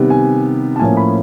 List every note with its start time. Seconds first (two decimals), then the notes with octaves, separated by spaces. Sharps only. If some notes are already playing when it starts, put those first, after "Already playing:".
Already playing: C3 D#3 G3 B3
0.10 G#5
0.76 A5
0.79 A2 F3 A#3 C#4 G#5
0.97 B5